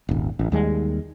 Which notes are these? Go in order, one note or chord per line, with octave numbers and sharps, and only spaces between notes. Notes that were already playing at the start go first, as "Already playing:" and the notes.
D#1 G#1
A1
D#2 G3 G#3